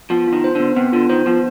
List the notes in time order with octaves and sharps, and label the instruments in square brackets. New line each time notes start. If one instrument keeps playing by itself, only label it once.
[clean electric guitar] F3 [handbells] B3
[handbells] F4
[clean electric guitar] D#3
[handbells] C5
[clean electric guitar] D3 [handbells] B3
[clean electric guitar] C3 [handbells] B3
[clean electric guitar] D3 [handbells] F4
[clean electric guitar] D#3 [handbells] C5
[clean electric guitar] F3 [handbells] B3